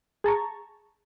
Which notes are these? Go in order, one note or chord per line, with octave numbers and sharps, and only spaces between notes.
G#4 A5 A#5 C#6